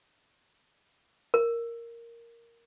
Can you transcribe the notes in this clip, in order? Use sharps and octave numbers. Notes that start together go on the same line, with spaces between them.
A#4